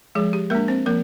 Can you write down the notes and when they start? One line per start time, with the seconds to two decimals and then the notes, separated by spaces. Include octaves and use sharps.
0.15 F3 G#3 G#4
0.33 G4
0.50 G#3 A#3 D4 A#4
0.68 C4 C5
0.86 F3 A#3 A#4